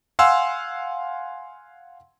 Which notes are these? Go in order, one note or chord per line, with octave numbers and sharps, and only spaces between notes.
F5 F#5 G#5 C6 E6